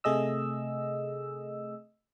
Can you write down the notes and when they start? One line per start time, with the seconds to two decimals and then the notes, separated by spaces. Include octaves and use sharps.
0.04 C3 A3 G#4 D#5 E6